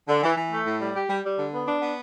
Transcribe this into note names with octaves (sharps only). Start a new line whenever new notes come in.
D3
E3
E3
A3
A2
G3
G4
G3
G3
D3
B3
D4
B3